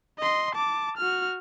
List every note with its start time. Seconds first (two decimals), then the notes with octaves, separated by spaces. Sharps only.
0.19 D#5 C6
0.55 A5 D6
0.97 F#4 F6